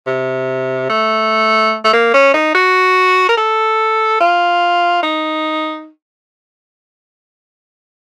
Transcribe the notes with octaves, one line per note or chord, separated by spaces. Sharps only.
C3
A3
A3
A#3
C#4
D#4
F#4
A#4
A4
F4
D#4